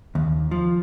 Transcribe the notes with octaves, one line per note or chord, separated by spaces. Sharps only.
D#2
F3